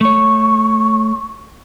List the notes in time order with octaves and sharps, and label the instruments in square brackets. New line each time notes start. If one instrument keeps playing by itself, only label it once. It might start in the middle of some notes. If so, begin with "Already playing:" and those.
[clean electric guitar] A3 C#5 [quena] C#6